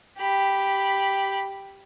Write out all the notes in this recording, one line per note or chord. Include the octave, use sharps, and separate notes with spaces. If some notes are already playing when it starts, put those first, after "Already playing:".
G4 B5